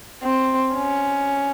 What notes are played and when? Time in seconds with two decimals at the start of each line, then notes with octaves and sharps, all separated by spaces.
0.23 C4
0.74 C#4